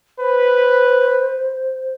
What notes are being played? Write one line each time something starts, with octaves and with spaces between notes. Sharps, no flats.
B4 C5